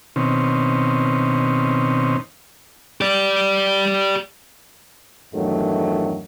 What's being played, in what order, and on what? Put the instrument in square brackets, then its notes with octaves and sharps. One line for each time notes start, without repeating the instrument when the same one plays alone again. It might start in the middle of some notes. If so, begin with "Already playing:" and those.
[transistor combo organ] B2 D#3 C4 C#4
[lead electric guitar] G4 D5
[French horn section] E2 G2 D#3 F#3 A3